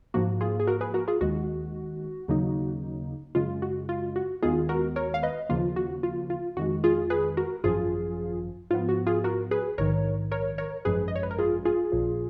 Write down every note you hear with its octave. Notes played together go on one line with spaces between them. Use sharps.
G#2 F3 A#3 F#4
F4 G#4
G#4
F#4 A#4
G#4 B4
F#4 A#4
F4 G#4
D#2 D#3 G#3 F#4
D#2 C#3 F#3 A#3 D#4
F#2 C#3 G#3 F4
F#4
F4
F#4
D#2 D#3 G#3 B3 F4 G#4
F#4 A#4
A#4 C#5
F5
B4 D#5
D#2 C#3 F3 A#3 F4
F#4
F4
F4
F2 D#3 G#3 F#4
F4 G#4
G#4 B4
F#4 A#4
G#1 F#2 F3 F4 G#4
G#2 F3 B3 F4
F#4
F4 G#4
F#4 A#4
G#4 B4
A#1 G#2 D#3 A#4 C#5
A#4 C#5
A#4 C#5
G#1 F#2 F3 G#3 G#4 B4
D#5
C#5
B4
A#4
F4 G#4
F4 G#4
A#1 A#2 F3